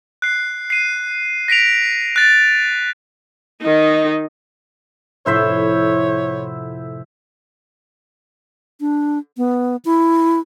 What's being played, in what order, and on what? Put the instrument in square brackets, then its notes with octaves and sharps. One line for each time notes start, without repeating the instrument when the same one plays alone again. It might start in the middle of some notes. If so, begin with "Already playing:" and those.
[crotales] F#6 C7
C7 D#7
A#6 B6 D7 F7
F#6 A6
[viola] D#3 D#4
[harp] F1 A2 [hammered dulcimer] E4 C5 E5 [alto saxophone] C#5
[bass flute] D4
B3
E4